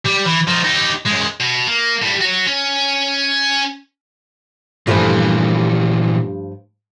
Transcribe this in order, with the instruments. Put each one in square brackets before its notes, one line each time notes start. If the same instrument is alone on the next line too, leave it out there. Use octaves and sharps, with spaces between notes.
[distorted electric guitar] G3
E3
F3 D#4
D#4 G4
F#2 G#3
B2
A#3
A2 G3
F#4 C#5
C#4
[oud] G2 F3 A3 [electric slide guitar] A#2 E3